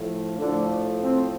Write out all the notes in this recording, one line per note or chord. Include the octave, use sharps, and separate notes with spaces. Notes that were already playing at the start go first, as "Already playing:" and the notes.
Already playing: A2 F3 A3
A2 D3 F3 A3 D4
C4